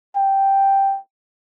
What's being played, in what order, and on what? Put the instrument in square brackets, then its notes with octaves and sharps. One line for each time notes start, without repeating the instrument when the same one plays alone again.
[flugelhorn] G5